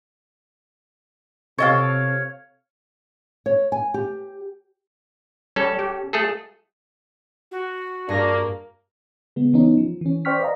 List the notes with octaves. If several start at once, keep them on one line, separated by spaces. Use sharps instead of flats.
C3 A4 C#5 D#5 F5 G5
C#5
G#5
G4
G3 C#4 A4
G4
A3 G#4 A4
F#4
G2 A#3 D4 G#4 A#6
C#3 G#3 B3
E3 B3 C#4 D#4
F3
E3 C#4
C5 D5 G5 C#6 F6 B6
B4 D5 D#5 F5 A#5